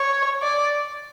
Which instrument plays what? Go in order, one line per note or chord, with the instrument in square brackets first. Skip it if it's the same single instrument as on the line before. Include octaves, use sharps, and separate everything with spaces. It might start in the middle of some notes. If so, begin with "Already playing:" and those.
Already playing: [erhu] C#5
D5